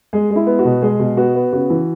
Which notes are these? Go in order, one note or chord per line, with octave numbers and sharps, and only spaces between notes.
G#3 G#4
G#3
E4
B3
F#4
B2
G#3 G#4
B2
B3 F#4
B3
C#3 F#4
E3